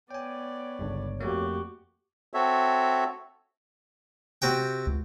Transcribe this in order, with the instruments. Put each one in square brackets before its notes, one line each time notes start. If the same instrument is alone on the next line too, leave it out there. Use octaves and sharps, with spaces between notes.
[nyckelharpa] B3 D5 [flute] C#5 [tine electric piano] G5 G#5
[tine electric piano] G1 C#2 G2
[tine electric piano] F2 A3 A#3 [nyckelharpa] F#4 G4
[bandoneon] C4 F#4 A4 C#5 E5
[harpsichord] C3 F#4 G5
[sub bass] C#2